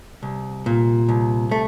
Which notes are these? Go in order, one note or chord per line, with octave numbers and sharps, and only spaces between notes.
C2
A#2
C2
A3